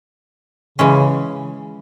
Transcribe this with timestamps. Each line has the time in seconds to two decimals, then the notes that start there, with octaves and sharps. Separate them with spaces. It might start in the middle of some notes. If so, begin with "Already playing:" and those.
0.78 C#3 E3 G#3 C#4